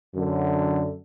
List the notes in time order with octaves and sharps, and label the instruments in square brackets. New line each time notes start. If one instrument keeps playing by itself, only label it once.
[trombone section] F#2 D3